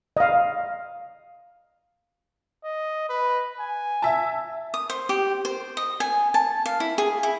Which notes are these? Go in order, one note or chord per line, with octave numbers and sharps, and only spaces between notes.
D#5 F5
D#5
B4
G#5
E5 A5
D#6
C5
G4
C5
D#5
G#5
A5
F5
E4
G#4
E4